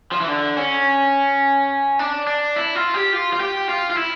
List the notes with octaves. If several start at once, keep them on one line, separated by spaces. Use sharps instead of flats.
F3
E3
D3
C#4
D4
D4
E4
F4
G4
F4
F4
G4
F4
F4
E4